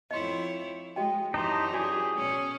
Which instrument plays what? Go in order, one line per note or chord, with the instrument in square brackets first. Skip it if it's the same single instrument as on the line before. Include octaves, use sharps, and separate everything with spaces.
[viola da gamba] F2 E4 C#5 [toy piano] D#5 C6
[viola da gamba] G#3 [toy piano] F#4 D#5 G5
[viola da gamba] F#2 E3 G4 [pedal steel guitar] D#4 A5 C6
[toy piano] F#4 D5 G#5 [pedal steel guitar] G#4
[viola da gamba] B2 C#4